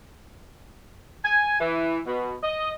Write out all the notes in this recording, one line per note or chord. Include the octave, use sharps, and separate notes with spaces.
G#5
E3
B2
D#5